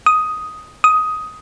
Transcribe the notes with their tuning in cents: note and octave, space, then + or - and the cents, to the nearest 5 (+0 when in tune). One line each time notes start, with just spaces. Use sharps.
D#6 +5
D#6 +10